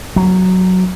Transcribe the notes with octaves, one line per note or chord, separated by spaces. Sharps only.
F#3